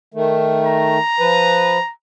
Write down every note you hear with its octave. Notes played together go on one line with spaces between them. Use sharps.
D#3 A3
A#5
F3 B4